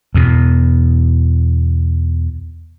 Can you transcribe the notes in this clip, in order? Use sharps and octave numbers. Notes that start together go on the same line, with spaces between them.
E2 B2